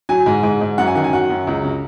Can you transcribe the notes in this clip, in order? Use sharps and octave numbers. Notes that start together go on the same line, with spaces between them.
F#3 G#5
G#2
G#2
G#2
F#2 F#5
G#5
D#3 F#5
G#5
F#3 F#5
F#2
C#2
C#3